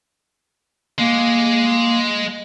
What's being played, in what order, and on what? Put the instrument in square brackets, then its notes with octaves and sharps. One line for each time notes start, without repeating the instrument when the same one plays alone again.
[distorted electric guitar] G#3 [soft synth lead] A#3